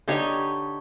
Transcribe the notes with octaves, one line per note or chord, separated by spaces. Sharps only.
D3 D#4 G4 C#5